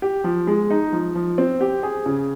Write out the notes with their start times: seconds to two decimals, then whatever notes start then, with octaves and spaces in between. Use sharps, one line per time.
0.02 G4
0.24 F3
0.47 G#3
0.71 D#4
0.92 F3
1.15 F3
1.38 C4
1.61 G4
1.83 G#4
2.06 C#3